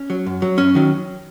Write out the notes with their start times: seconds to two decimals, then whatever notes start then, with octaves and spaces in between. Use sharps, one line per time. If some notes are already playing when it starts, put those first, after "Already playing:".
Already playing: C#4
0.10 F#3
0.26 F#2
0.42 F#3
0.58 F#2 C#4
0.75 D#3 F#3